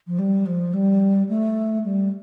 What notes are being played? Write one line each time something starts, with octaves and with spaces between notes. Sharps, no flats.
F3
G3
F3
G3
A3
G3